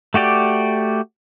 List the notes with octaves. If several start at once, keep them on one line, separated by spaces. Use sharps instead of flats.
A3 F#4 G4 D5